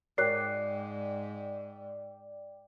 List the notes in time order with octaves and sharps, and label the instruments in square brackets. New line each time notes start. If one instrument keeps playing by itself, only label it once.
[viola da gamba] G#2 [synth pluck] F#4 A#4 C#5 [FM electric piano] D5 G5 [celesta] F#6 C7